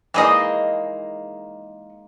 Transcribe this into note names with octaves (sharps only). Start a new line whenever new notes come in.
E3 G#3 A#3 D#4 G#4 D#5